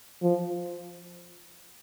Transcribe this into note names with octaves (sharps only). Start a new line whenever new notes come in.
F3